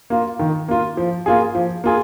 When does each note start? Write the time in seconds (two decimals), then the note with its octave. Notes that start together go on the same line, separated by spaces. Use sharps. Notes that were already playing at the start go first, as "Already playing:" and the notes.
0.10 A#3 F4
0.39 D#3
0.68 A#3 F4
0.97 F3
1.26 A#3 F4 G#4
1.55 F3
1.84 A#3 F4 G#4